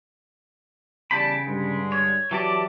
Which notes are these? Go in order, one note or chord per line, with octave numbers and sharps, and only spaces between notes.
E2 C#3 G3 G5 A5 B5
G2 D3 G#3
C#5
E3 F#3 G4 D5 A5